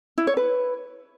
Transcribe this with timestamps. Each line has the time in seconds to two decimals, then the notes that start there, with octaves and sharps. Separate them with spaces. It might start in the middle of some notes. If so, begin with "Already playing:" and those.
0.18 E4
0.27 C#5
0.37 B4